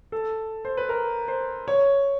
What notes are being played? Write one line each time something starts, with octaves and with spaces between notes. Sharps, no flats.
A4
C5
B4
A#4
C5
C#5